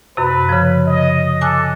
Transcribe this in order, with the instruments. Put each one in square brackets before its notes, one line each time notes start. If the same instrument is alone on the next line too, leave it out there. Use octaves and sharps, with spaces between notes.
[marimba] F#2 C3 [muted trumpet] B4
[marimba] C#3 F3
[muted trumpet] D#5
[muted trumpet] A4 [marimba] G#5 D6 F#6